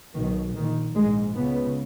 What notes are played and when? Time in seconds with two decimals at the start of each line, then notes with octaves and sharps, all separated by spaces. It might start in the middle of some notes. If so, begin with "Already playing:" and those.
0.15 B1 B2 D#3
0.55 A#1 A#2 D#3
0.95 A#1 G#2 G#3
1.34 C#2 C#3 B3